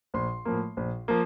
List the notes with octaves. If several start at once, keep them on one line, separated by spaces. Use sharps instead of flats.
A#1 C6
A2 F3 A#3
A#1
F3 A#3